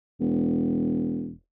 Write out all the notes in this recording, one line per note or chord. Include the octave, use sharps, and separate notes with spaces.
E1